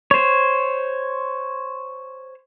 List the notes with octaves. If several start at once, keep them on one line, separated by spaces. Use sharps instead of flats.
C5 C#5